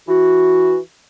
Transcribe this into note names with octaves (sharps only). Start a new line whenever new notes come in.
E3 F#4